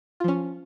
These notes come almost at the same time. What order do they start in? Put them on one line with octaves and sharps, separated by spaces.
F4 F3 C#4